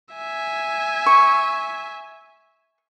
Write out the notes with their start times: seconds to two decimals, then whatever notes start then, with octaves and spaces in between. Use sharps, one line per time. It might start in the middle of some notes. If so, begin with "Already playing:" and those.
0.15 E5 G#5
1.06 C#6